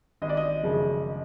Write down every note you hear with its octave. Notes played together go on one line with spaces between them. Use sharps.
G#1 D#5
D5
D#5
F#2 C#3 F3 G#3